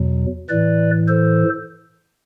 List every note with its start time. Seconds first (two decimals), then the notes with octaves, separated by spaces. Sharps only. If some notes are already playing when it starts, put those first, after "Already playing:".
Already playing: E2 B2 F#3
0.49 A2 E3 B4 D5
1.08 A4 C5